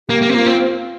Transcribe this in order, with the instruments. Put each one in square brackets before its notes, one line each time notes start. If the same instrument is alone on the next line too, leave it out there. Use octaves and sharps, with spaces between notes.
[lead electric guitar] A#3 [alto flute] G4
[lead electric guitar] A#3
C4
[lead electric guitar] A#3 [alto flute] F4
[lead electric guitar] C4